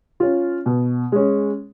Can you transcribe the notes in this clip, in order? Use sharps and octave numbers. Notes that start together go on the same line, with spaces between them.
C#4 F4
B2
G#3 C#4